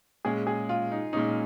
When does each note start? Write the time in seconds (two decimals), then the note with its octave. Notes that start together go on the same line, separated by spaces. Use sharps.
0.25 A#2 G#3 C#4 G#4
0.47 G#4
0.69 F4
0.92 D#4
1.13 A#2 G#3 C#4 D#4